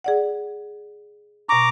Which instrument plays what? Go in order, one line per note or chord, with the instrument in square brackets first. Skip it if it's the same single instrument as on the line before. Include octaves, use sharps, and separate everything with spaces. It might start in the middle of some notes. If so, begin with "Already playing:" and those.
[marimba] G#4 D5 F#5
[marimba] B2 C#6 [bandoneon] A#5 D6